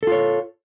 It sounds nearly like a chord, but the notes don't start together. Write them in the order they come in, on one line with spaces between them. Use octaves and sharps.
A4 F4 C#5